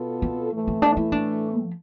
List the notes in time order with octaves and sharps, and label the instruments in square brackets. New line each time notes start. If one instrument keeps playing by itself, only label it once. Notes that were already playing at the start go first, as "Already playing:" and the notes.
Already playing: [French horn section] B2 B3 F4 A4
[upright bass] C4
[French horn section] A2 E3 A3
[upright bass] C4
D4
E4
D4
F3